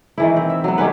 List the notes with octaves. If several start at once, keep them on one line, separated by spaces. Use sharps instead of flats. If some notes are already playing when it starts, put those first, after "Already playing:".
D#3 E3 E4
C4
E5
F#3 B3
D#3 G3 C#4 B4